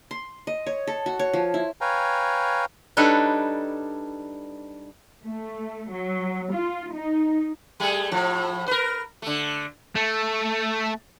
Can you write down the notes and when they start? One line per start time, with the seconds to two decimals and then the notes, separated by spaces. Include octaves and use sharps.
0.11 C6
0.47 D#5
0.66 C#5
0.87 A4
1.06 F#4
1.19 C#5
1.33 F3
1.54 E4
1.81 B4 C#5 F5 G5 G#5 A#5
2.97 G3 D4 D#4 A4 B4 C#5
5.25 A3
5.92 F#3
6.53 F4
6.93 D#4
7.80 G3 A3 G#4
8.11 A2 F3
8.68 A#4 B4
9.22 D3 A3
9.95 A3